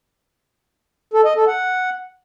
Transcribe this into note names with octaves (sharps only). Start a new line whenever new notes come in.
A4
D#5
A4
F#5